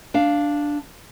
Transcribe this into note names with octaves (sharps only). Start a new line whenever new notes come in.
D4 F5